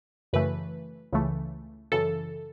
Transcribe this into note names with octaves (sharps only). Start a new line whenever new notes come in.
F#2 C#3 E3 A3 B4
C#2 C#3 E3 A3
F#2 C#3 E3 A4